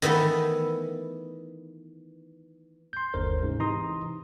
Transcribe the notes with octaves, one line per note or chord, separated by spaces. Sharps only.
D#3 E3 A3 B3
C6 G6
G1 D#2 D3 A#4 C5
G#2 C#3
C3 E3 D#4 A#5 C6 D#6